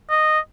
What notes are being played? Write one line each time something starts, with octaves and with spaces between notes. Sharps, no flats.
D#5